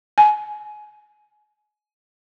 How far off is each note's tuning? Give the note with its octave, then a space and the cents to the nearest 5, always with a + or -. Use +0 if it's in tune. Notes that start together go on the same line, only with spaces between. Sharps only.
G#5 +25